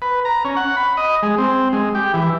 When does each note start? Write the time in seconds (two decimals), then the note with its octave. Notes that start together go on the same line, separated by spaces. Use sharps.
0.02 B4
0.25 A#5
0.45 C#4
0.56 F#5
0.77 B5
0.97 D#5
1.23 G#3
1.38 C4
1.73 G#3
1.95 G4
2.14 E3